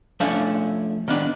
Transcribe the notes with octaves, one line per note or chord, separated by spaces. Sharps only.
F3 A3 C#4 D4 E5
D#3 B3 D4